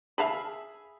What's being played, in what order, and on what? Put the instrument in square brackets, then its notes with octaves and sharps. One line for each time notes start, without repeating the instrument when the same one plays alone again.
[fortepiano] G#4 E5 G#5 [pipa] F5 A5 B5